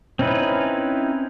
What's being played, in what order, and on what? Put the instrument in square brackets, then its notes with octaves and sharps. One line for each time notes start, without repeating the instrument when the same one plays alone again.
[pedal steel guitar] C4 C#4 D#4 E4 B4